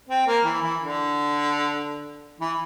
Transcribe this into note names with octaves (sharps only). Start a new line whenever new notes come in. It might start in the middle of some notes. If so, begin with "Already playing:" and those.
C4
A#3
E3
E3
D3
E3